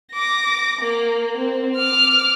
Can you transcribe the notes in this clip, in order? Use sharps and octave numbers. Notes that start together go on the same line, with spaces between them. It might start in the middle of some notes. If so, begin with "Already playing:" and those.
D6 A#6
A#3
C4
D6 F6